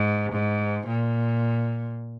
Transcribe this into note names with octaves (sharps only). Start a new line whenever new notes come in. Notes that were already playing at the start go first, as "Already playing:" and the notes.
Already playing: G#2
G#2
A#2